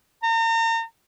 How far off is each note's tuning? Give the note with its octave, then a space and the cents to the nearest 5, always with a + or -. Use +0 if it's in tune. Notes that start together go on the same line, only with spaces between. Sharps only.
A#5 -40